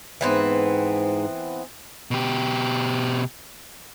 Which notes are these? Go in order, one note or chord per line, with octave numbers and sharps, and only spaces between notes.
G#2 E3 B3 C4
B2 G4